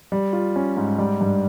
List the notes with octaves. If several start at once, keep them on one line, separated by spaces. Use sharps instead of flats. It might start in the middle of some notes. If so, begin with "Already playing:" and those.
G3
F4
C#4
G#2
G3
G2